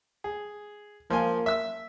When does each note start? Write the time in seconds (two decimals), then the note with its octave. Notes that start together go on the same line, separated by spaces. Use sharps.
0.24 G#4
1.10 F3 A#3 F4 G#5
1.46 E5 E6